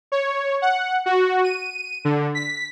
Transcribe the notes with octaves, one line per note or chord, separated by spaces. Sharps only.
C#5
F#5
F#4
D#7
D3
B6